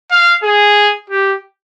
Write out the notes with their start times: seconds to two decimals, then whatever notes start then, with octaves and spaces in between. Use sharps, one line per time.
0.11 F5
0.43 G#4
1.10 G4